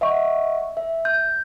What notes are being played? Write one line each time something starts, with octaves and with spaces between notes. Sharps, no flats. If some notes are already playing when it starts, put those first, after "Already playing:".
D#5 E5 F#5 C#6
E5
G6